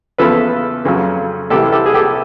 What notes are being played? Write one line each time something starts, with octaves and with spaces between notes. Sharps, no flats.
E2 C#3 F3 A4 B4
F2 C#3 F#3
C2 C3 E3 G4 A4
G4 A4
G#4
G4 A4